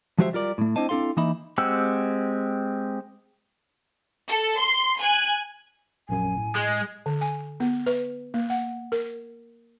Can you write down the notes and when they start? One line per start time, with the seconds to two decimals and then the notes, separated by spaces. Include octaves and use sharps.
0.18 F3 G#3 F#4 G4 C5 E5
0.33 G3 F4 A#4 D5
0.58 A2 A3
0.76 C4 D4 E4 C5 D#5 A5
0.89 C4 D4 E4 A4 F5 C6
1.17 E3 A#3 D#4 D#5 E5 B5
1.58 G#3 C4 G4 F#5 E6
4.29 A4
4.59 C6
5.01 G#5 F#6
6.09 A#1 F#2 G#5
6.37 A2
6.56 G#3
7.06 D3
7.21 G#5
7.60 B3
7.86 B4
8.34 A#3
8.50 F#5
8.92 A#4